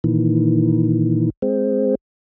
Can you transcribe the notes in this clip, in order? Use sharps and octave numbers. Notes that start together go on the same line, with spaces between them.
A#2 D#3 E3
G#3 C4